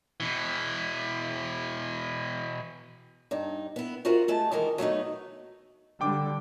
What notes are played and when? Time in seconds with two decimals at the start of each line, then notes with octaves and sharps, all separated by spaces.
0.20 B2 E3
3.31 G2 D#4
3.76 B3 E4
4.05 F4 F#4 A#4 C5 E5 F#5
4.28 G#3 A3 A5
4.51 D#3 E3 G#3 A4 A#4
4.78 F#3 A3 B3 D#4
6.01 D3 G3 G5 D6